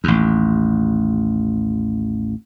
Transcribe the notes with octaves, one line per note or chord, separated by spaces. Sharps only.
A1 D#2